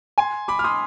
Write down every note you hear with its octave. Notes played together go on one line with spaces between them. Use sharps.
G#5 C6
B5 D6
F6
C6 D#6